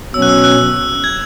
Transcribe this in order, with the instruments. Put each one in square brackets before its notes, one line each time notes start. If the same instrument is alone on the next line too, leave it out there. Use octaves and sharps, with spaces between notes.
[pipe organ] B2 F#3 C#4 [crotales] E6
[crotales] F#6
E6
F#6
G#6